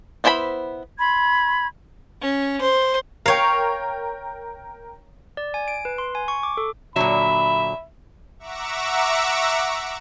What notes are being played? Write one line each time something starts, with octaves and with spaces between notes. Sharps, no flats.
B3 E4 C5 G#5 B5
B5 C6 G#6
C#4
C5
A#4 C#5 F5 G5
D5
G#5
D7
B4
C6
G#5
C#6
D6
A4
A#2 D3 F#3 E5 B5
E5 F#5 A#5 C#6 D6 E6